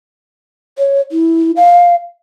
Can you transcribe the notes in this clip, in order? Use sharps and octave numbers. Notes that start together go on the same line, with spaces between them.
C#5
E4
F5